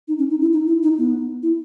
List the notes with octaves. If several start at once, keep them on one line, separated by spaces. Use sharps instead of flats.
D#4
C#4
D#4
E4
D#4
E4
D#4
B3
E4